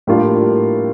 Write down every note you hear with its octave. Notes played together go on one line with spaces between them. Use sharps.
A2 G3 A#3 D4 F4